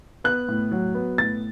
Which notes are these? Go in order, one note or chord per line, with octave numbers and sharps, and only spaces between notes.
B3 F#6
A2
F#3
B3
A2 A6